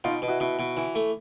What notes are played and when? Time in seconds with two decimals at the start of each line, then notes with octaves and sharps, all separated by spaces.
0.04 B2 D#4 F4
0.22 B2
0.28 E4 F#4
0.40 B2 E4 F#4
0.59 B2
0.77 E3
0.95 A3